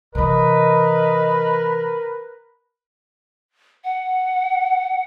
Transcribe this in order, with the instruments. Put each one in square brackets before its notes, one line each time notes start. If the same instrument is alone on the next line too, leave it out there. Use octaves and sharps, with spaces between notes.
[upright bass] C3 E3 [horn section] A#4 B4 [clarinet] D#5
[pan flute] F#5